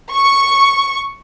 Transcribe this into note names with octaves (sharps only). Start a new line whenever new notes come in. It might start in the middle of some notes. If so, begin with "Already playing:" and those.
C#6